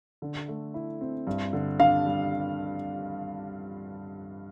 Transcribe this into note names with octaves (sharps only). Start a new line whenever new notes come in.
D3
A3
E4
C4
G2
D3
D4 F5
G3